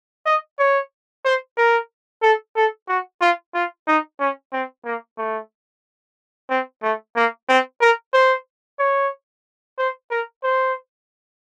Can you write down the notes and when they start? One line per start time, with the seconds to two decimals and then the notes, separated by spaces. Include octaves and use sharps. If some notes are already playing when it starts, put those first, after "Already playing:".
0.26 D#5
0.59 C#5
1.25 C5
1.57 A#4
2.23 A4
2.56 A4
2.88 F#4
3.21 F4
3.54 F4
3.87 D#4
4.20 C#4
4.53 C4
4.85 A#3
5.18 A3
6.50 C4
6.83 A3
7.16 A#3
7.49 C4
7.81 A#4
8.13 C5
8.79 C#5
9.78 C5
10.11 A#4
10.43 C5